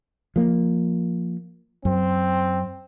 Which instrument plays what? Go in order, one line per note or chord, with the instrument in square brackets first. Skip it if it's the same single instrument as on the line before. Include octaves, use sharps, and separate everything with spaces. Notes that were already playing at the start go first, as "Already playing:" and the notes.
[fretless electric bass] F3 A#3
[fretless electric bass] F#2 [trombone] C4